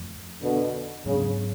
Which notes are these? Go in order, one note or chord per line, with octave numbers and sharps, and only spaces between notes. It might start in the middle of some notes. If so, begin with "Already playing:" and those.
Already playing: F2 F3 A3
B2 D3
G#2 C#3 F#3 B3 D4